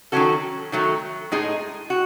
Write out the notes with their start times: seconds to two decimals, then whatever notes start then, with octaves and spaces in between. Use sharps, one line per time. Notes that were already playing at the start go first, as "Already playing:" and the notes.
0.12 D#3 F#3 C#4 F#4 A4
0.72 D#3 F#3 A3
1.32 A2 G#3 D#4 G#4
1.90 F#4